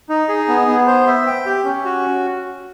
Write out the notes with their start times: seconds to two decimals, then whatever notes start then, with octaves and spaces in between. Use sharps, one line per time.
0.09 D#4
0.29 G#4
0.48 B3
0.68 B3
0.87 C5
1.07 E5
1.27 G5
1.46 G4
1.65 C#4
1.85 F#4